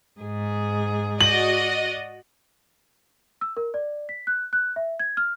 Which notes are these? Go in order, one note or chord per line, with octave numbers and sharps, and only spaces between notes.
G#2 G#4
F#4 D5 D#5 F#7
E6
A#4
D5
B6
F#6
F#6
E5
G#6
F6